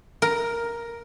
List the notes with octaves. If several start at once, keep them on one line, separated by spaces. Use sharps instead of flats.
A#4